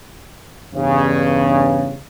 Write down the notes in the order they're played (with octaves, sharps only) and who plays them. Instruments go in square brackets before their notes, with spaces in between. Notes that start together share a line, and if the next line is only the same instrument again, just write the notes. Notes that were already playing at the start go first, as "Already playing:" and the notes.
[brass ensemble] E2 G2 C#3